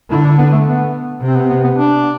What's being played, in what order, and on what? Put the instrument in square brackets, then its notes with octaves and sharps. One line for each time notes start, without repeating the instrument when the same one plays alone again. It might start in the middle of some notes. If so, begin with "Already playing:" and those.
[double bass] D3 [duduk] E4
[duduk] D4
B3
A3
B3
[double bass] C3
[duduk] C4
B3
B3
B3
D4